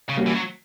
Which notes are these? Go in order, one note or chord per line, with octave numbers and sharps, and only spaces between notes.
C#3
G3 A#3 C#4 F#4
E3
F#3